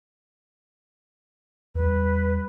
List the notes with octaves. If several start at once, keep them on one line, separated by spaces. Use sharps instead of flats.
E2 G3 B4